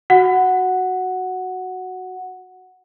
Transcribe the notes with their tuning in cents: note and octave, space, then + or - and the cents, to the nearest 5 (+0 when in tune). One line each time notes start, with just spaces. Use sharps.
F#4 +0 F#5 +0